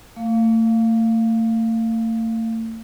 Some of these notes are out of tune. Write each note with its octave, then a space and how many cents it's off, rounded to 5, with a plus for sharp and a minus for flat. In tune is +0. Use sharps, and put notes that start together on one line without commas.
A3 +40 F5 +0